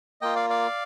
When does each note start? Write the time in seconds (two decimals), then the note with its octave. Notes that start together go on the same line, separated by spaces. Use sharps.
0.21 A#3 F4 D#5 G5
0.35 D5 F5
0.50 D5 F5